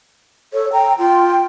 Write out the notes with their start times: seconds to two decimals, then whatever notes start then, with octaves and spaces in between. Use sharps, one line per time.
0.53 A4 C#5
0.73 G5 A#5
0.98 F4 G5